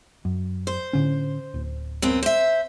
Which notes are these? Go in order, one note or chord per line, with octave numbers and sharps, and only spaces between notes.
F#2
C5
A2 D3 C#4
D1
F#2 B3 C4
C5 E5